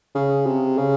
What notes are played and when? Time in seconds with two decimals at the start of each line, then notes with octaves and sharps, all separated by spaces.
0.15 C#3
0.46 C3
0.78 C#3